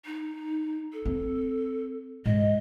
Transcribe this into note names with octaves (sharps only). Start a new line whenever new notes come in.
D#4
A4
C4
G#2 D#5